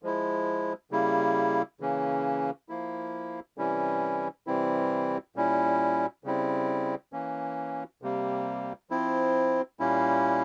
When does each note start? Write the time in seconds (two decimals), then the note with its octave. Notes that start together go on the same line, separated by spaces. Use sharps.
0.03 F3 G#3 E4
0.91 C#3 G3 A#3 E4
1.80 C#3 E3 A#3 C#4
2.69 F3 A#3 E4
3.58 C3 E3 G3 C#4 E4
4.47 C3 E3 G3 C4 E4
5.36 A#2 G3 C#4 E4
6.24 C#3 G3 C4 E4
7.13 E3 A#3 C#4
8.02 C3 G3 A#3
8.90 F3 C4 E4
9.80 A#2 G3 A#3 C#4 E4